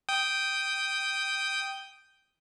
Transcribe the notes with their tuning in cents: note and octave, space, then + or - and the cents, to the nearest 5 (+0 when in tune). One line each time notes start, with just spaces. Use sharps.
G5 -5 D#6 +0